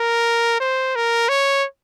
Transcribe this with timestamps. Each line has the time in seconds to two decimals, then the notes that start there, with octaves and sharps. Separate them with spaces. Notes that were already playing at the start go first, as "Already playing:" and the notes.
Already playing: A#4
0.60 C5
0.95 A#4
1.29 C#5